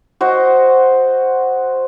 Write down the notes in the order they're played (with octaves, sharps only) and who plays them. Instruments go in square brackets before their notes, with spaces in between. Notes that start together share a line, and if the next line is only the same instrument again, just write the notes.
[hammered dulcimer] F#4 C5 D#5